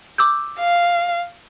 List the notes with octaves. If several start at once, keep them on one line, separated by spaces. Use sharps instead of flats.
D6 E6 G6
F5